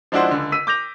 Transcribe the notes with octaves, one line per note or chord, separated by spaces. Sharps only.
F3 G#3 D4 E4 F#4 C5
C#2 D3
E6 B6 D#7
D6 G6 A#6 F7